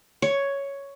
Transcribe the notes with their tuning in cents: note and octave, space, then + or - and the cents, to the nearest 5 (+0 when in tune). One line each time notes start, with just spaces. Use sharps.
C#5 +5